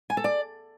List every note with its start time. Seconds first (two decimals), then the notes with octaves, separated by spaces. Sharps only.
0.10 G#5
0.17 A4
0.24 D5